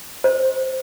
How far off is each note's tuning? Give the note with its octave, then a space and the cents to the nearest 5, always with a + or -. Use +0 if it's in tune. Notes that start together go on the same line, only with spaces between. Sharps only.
C5 +0